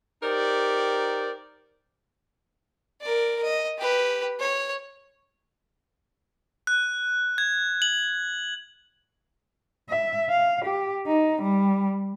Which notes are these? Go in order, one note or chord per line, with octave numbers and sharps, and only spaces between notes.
D#4 G4 A#4 C5 D5
A#4 D5
D#5
G4 B4
C#5
F#6
G#6
F#7
E5
F5
G4
D#4
G3